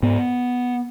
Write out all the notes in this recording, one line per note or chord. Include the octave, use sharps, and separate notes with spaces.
G#2 B3